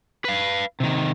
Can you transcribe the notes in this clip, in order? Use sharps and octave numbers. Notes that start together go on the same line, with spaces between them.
B4 F5
C3 D#3